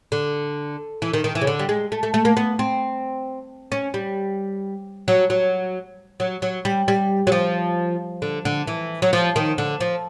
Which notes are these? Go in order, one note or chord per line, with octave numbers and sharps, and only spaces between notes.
D3
E3
D#3
D#3
E3
C#3
D3
G3
G#3
A3
A3
A3
A#3
B3
C4
C#4
G3
F#3
F#3
F#3
F#3
G3
G3
F#3
F3
D3
D3
E3
F#3
F3
D#3
D3
F3